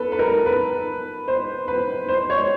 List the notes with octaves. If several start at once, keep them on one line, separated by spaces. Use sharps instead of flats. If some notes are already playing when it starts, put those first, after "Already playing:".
Already playing: A4 B4
B4
A#4
B4
C5
B4
C5
C#5